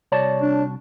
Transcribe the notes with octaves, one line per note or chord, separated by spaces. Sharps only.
C2 F#4 C#5 D5 A5
D4